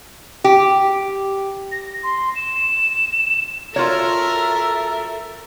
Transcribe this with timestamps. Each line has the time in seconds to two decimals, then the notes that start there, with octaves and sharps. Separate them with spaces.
0.44 G4
1.72 A#6
2.03 C6
2.36 E7
3.76 F4 F#4 A4 A#4 C#5 E5